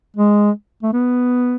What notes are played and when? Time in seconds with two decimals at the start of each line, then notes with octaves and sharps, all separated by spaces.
0.16 G#3
0.83 A3
0.93 B3